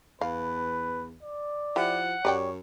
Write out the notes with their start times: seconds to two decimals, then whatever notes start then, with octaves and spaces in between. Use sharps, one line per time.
0.21 E2 B4 F5
1.23 D5
1.76 F3 E4 G4 F#5
2.25 F#2 G4 C#5 D5 G5